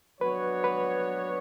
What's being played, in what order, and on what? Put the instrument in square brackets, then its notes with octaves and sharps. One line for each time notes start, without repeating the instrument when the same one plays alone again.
[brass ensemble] F#3 B3 D4 F#4 C#5 [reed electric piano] B4
[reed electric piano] B4